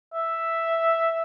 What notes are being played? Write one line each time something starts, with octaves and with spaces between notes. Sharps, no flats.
E5